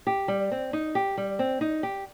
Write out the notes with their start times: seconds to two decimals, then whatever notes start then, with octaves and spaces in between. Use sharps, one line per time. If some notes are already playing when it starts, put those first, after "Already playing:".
0.07 G4
0.28 G3
0.51 C4
0.73 D#4
0.95 G4
1.17 G3
1.39 C4
1.61 D#4
1.83 G4